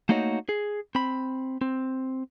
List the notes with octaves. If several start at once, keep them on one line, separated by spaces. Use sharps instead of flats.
A3 A#3 D#4 F#4 C#5 D#5
G#4
C4 B5
C4